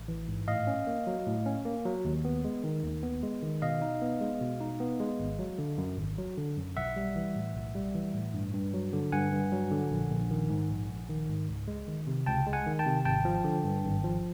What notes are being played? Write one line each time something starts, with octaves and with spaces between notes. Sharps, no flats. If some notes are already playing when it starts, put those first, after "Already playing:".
Already playing: A1
E3
G#2
A2 D#5 F5
C#4
A#3
F#3
A2
C#4
A#3
F#3
D#2
B3
G#3
D#3
D#2
B3
G#3
D#3
B2 D#5 F5
D#4
B3
G#3
B2
D#4
B3
G#3
G#1
F#3
D3
F#2
G#1
F#3
D3
F#2
B1 E5 F#5
G3
E3
A2
B1
G3
E3
A2
G2
G2
F#3
D3
G2 F#5 G#5
G2
F#3
D3
A#1
A#1
D#3
G#2
A#1
A#1
D#3
G#2
C#2
G#3
D#3
C3
C#2 G5 A5
G#3
F#5 G#5
D#3
G5 A5
C3
G#1 G5 A5
F3
D3
G2
G#1
F3